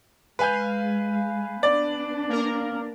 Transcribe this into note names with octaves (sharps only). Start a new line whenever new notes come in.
G#3 B4 F5 G#5 G6
B3 D4 D5
A#3 A#4